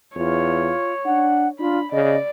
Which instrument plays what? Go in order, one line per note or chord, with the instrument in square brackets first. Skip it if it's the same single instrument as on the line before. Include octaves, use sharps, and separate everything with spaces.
[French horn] E2 [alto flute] F4 [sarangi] C#5
[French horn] D4 [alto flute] F#5
[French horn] D4 [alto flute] F4 [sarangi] B5
[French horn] C#3 [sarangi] D5 [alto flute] D#5